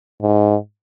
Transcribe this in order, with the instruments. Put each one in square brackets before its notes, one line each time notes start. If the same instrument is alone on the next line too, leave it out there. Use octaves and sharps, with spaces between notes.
[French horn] G#2